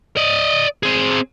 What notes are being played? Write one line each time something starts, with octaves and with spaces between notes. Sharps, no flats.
D5 D#5
C4 G#4